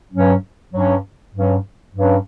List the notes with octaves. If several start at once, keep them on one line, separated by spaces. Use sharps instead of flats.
G2 F#3 C#4
G2 F#3 C#4
G2 F#3 C#4
G2 F#3 C#4